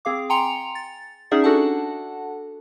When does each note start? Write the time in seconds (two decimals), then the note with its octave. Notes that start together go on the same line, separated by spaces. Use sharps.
0.05 C4 G#4 F5 D6
0.30 G5 G#5 A#5 C6 C#7 F7
0.75 A6
1.31 C#4 D#4 G#4 D5 E5 F#5
1.44 D4 F#4 A4 F#5 A5